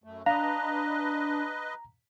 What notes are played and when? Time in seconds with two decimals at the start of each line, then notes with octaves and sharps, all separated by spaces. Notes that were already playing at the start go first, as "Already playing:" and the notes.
0.04 F#2 A3
0.26 D4 B4 D#5 F5 A#5